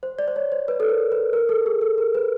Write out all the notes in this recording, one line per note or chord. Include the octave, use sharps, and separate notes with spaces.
C5
D5
C5
C#5
C5
B4
A4
A#4
B4
A#4
A4
G#4
A4
A#4
B4